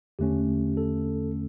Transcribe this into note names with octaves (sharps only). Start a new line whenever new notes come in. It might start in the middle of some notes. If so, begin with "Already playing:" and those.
E2 D3 A3 C#4 G4
A4